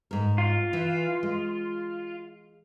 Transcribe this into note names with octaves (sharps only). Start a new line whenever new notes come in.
G#2 A#4
F4
E3
G#3